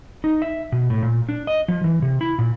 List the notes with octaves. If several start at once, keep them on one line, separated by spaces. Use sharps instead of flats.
D#4
E5
B2
A2
A#2
D4
D#5
F3
E3
C3
E4
A#2